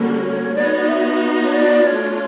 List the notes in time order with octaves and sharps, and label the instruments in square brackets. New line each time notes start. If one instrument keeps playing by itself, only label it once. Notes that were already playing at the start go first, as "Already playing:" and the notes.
Already playing: [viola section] D3 G3 A#3 C#4 F#4
[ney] C#5
[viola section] B3 D#4 F#4 [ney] D5
[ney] C#5
D5
E5
C#5
D5
[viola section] A3 D4 F4 [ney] C#5